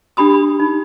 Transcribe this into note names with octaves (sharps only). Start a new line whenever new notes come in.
D4 G4 B5 D#6
D#4